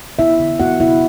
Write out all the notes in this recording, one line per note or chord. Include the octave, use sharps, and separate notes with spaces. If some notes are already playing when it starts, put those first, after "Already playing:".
B3 E4 E5
D3
B3 F#4 F#5
C3 E4 E5